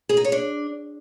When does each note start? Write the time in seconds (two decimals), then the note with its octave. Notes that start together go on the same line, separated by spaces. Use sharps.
0.09 G#4
0.17 D#4
0.24 C#5
0.32 D4